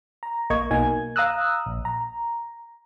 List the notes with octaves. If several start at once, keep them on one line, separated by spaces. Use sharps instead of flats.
A#5
A#1 A#3 D#5 C#6 G#6
B1 B2 A#3 D#4 G#5 G#6
F5 A#5 D#6 E6 F#6
A#1
A#5